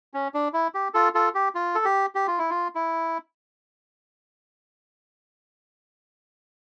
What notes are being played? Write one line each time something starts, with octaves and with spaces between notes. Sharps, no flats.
C#4
D4
E4
G4
F4 A4
F4 A4
G4
F4
A4
G4
G4
F4
E4
F4
E4